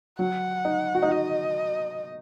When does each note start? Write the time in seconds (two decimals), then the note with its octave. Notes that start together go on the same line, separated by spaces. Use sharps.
0.19 F#3 F#5
0.65 D#4
0.95 F#4
1.03 D#4
1.10 F#4 D#5